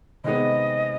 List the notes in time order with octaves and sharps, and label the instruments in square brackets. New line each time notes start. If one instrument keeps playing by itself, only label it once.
[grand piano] C3 D#3 G#3 B3 [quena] D#5